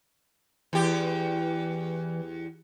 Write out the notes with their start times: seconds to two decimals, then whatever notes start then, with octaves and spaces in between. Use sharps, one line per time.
0.73 E2 E3 G4